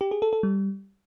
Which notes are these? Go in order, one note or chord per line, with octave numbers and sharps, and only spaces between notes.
G4
G#4
A4
A4
G3